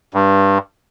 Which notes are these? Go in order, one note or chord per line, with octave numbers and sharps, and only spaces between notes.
G2